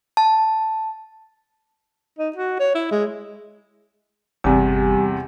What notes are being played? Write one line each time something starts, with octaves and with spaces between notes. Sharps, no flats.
A5
D#4
F#4
C#5
E4
G#3
G1 E2 C3 G3 G4 G#5